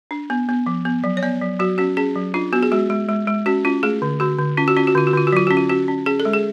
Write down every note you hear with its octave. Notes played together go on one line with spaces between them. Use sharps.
D4
B3
B3
F3
B3
F#3
C#5
B3 D5
F#3
F#3 F#4
C#4 F#4
C#4 G#4
F#3
D4 F4
B3 F#4
G#4
G#3 F#4
G#3
G#3
G#3
C#4 F#4
C#4 F4
A3 G#4
D3
D3 F#4
D3
C#4 F4
F#4
C#4 F4
F#4
D3 F4
F#4
D3 F4
F#4
F#3 F4
C#4 F#4
F4
C#4 F#4
C#4
C#4 G#4
A4
G#3
G#4